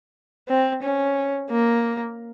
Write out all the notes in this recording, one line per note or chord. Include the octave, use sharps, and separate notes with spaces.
C4
C#4
A#3